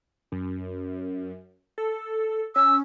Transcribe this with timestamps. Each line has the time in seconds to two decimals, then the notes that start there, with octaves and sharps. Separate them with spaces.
0.32 F#2
1.78 A4
2.56 C#4 E6